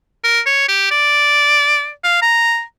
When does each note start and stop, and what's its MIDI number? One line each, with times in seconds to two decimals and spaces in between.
0.24 0.41 70
0.46 0.65 73
0.69 0.91 67
0.91 1.91 74
2.03 2.17 77
2.22 2.62 82